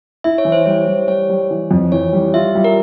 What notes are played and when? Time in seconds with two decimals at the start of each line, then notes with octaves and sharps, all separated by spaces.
0.24 E4 E5
0.38 C#5
0.45 E3
0.52 C5
0.66 G3 C#5
0.88 G3
1.08 G3 C#5
1.29 G3
1.51 E3
1.71 F2
1.92 E3 C#5
2.13 G3
2.34 F4 E5
2.55 G3
2.64 A#4